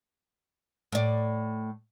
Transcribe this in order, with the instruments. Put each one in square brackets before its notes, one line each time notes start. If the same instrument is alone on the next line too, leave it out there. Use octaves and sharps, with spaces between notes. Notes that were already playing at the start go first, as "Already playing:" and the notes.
[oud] A2 D5